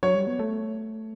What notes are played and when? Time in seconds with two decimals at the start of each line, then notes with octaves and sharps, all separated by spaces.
0.03 F#3 C#5
0.15 G3
0.27 B3
0.39 A3